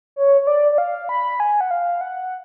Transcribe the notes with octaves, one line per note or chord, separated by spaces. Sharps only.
C#5
C#5
D5
D5
F5
B5
G#5
F#5
F5
F#5